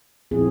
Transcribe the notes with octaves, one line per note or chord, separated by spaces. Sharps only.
A#2 F3 C4 E4 G#4